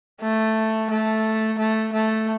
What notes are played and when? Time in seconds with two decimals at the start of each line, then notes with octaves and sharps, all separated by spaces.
0.21 A3
0.91 A3
1.58 A3
1.93 A3